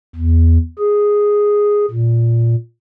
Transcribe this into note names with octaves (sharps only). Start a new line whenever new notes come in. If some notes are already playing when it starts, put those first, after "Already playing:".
E2
G#4
A#2